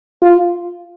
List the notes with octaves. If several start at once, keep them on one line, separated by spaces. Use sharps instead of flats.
F4